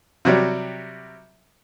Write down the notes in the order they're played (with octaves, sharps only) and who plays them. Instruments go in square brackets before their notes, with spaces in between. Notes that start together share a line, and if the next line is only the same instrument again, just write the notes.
[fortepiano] C3 F#3 G3